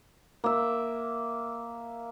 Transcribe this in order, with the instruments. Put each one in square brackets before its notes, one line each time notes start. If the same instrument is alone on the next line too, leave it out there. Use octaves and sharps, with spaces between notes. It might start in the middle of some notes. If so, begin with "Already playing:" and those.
[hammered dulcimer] A#3 E5